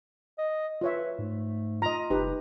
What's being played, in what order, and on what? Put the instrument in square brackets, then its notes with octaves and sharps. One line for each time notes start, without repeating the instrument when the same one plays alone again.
[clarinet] D#5
[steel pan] F4 C#5 E5 [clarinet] B4
[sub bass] G#2 [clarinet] A3
[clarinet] F4 [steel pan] D#5 A#5
[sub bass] F#1 [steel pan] D#4 G4 B4